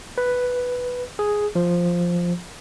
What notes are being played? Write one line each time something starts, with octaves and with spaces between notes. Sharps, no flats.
B4
G#4
F3